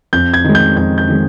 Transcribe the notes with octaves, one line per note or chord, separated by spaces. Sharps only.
F2 G6
G#6
D#3 G#3
G6
F2 G6
G6
D#3 G#3